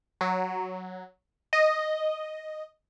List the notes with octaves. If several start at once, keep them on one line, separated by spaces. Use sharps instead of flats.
F#3
D#5